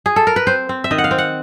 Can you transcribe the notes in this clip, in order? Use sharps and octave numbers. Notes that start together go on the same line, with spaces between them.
G#4
A4
A#4
B4
C4 C5
C4
E5
D#3 D#5
F#5
F5
C4
F#5